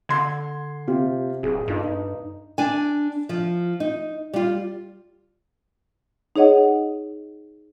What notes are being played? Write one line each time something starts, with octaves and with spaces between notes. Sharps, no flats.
D3 C6 G#6
C3 F4 G4
D1 G#4
G2 D#4 F4 A4
D#4
D4 G#5
F3
D#4
G3 F4
D#4 G#4 C#5 D#5 F#5